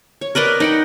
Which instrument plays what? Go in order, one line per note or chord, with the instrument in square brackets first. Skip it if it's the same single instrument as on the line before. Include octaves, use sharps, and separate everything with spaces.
[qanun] C#5
A#4 B4 D5 D#5
D#4 F#5 G5